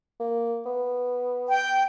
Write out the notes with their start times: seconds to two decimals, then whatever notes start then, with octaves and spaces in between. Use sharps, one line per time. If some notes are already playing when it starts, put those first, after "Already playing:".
0.20 A#3
0.66 B3
1.50 G5